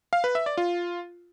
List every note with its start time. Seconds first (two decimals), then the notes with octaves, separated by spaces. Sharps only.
0.13 F5
0.24 B4
0.35 E5
0.46 D5
0.57 F4